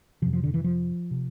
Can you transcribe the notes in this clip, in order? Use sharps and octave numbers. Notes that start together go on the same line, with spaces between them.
F2 C3 F3
F3
D3
E3
F3
C3